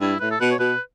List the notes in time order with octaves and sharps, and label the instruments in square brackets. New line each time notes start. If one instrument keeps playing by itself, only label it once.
[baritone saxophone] G2 [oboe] E4
[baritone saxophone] A2 [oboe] B4
[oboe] A4
[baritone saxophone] B2 [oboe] B4
[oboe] C#5
[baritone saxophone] B2 [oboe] B4